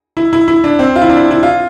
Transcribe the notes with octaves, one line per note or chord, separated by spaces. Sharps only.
E4
E4
E4
D4
C4
F4
E4
D4
E4
E4
F4